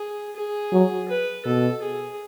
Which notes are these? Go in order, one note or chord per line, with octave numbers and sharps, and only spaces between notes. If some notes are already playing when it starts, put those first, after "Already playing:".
Already playing: G#4
G#4
F#3
B4
B2 A4
G#4